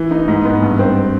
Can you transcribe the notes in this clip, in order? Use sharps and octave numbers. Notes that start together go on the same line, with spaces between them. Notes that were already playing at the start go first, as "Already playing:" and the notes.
Already playing: E3
D#4
G#2
B3
G2
C4